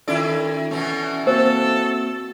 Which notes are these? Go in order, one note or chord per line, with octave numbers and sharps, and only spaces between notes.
D#3 C#4 E4 F4 A4 D5
B2 E3 A3 C#4
A#3 C4 F#4 A4 C5